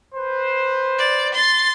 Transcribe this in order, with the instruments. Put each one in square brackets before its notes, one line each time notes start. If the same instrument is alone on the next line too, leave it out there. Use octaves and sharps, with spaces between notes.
[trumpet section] B4 C5
[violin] D5
C6 A6